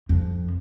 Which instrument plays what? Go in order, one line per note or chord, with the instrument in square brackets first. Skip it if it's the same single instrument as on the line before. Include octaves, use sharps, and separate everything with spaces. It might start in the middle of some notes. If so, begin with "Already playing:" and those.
[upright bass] F2